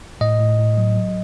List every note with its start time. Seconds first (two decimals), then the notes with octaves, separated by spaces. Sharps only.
0.21 A2 D#5
0.40 A2
0.59 A2
0.77 F#3
0.96 F#3